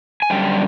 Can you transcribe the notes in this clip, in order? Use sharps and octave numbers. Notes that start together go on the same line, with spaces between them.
G#5
F#2 D3 G3 G5